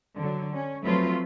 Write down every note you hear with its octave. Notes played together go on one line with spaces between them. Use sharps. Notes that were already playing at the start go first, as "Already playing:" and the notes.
D3 F#3
C#4
F3 F#3 A3 C4 F4 B4